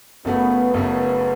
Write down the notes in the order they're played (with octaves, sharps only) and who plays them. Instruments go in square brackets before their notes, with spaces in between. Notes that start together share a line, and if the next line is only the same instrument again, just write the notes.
[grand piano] F#1 F#2 C#3 A3 F#4 [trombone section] B3
[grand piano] F#1 F#2 C#3 A3 F#4 [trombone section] B3